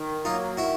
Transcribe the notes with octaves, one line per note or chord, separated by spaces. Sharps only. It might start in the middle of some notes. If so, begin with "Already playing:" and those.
Already playing: D#3
F#3 A#3 D#4 F4
D#3 E4 F#4